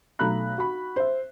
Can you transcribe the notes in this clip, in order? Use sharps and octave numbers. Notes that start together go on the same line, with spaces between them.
B1 A3 A4 A#5 B5 F#6
F#4 B5
C5 E5